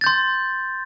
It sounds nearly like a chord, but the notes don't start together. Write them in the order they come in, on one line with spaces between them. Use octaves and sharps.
A6 G6 C6